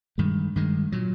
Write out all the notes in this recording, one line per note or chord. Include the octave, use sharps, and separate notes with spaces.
G2 D#3 G#3
G2 D#3 G#3
A#2 F#3